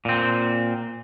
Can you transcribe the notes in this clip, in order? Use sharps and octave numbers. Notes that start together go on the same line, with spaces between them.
A#2 C4